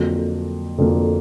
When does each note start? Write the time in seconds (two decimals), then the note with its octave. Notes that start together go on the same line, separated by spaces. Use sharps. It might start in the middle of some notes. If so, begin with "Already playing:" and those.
Already playing: F2 D3 F#3 A#3
0.78 F2 D3 F#3 A#3